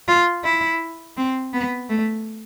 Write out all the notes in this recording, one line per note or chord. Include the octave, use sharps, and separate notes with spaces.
F4
E4
C4
B3
A3